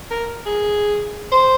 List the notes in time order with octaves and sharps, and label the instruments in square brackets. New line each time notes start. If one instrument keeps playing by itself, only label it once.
[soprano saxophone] A#4
G#4
C5